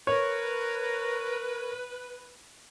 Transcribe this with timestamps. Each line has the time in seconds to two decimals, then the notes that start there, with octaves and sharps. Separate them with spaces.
0.07 A#4 B4 C#5